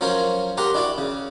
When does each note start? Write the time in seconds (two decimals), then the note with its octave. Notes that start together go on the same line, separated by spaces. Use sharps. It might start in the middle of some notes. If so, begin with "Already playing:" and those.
0.01 F3 F#3 C#4 A#4 C5 C#5
0.57 G4 A#4 F#5 A#5 C6
0.74 D4 E4 F#4 D5
0.98 C#3